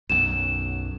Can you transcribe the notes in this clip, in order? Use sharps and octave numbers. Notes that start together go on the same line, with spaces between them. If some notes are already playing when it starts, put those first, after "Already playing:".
B1 F#2 E7